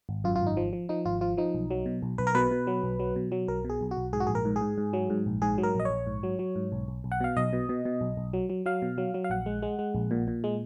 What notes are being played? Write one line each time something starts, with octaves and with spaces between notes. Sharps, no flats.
G#1
F#2 F4
F4
G#1
D#4
F3
F3
F3 D#4
G#1 F4
F3 F4
F3 D#4
B1
F#3
B2
B1
B1 B4
A#4
B2 B4
B2
F#3
B1
F#3
B2
F#3
B1 A#4
B2 G#4
B1
F#4
B1
G#2 G#4
F#4
A#1 G#4
A#4
G#2
G#4
G#2
G#2
F#3
G#2
A#1
G#2 G#4
F#3
A#4
A#1 D#5
C#5
A#1
G#2
F#3
F#3
G#2
B1
B1
B1
F#5
B2 F5
B1 D#5
B2
B2
B2
B1
B1
F#3
F#3
F#3 F5
B2
F#3
F#3
F5
A#1 F#5
G#3
G#3
G#3
A#1
A#2
A#2
G#3